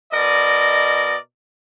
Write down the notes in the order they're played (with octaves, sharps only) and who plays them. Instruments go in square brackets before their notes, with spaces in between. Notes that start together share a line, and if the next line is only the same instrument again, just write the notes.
[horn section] B2 A#4 D5 D#5